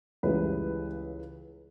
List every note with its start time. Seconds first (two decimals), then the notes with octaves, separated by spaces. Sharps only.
0.23 C#2 C#3 E3 G3 B4